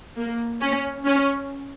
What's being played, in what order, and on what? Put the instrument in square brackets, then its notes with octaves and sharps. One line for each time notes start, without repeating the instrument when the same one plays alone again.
[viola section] A#3
C#4
C#4